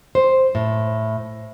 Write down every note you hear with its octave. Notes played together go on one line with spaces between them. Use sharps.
C5
A2